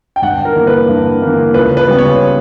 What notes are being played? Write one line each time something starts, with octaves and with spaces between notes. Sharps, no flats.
G5
G2 F#5
A#4
E3 A#3
B4
G2
E3 A#3
C#2 B4
B4
C#3 G3 B3
C#5